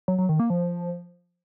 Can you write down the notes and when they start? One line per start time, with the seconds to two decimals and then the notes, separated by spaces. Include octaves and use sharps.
0.08 F#3
0.18 F#3
0.29 D#3
0.39 A#3
0.50 F3